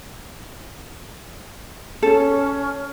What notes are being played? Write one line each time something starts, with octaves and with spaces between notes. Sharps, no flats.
C#4 A4